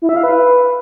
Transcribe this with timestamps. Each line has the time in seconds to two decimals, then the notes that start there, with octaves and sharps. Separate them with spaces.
0.02 E4
0.09 E5
0.16 F5
0.24 B4